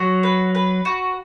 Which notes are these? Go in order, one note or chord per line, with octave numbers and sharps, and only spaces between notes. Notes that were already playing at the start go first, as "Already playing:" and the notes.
Already playing: F#3 F#4
B4
B4
F#4